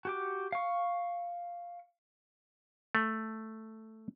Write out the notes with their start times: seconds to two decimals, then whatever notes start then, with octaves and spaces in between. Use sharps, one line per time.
0.05 F#4 G4 D6
0.52 F5 C#6
2.95 A3